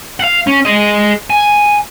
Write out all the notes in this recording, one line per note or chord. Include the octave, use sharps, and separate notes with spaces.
F5 F#5
C#4
G#4 D#5
G#5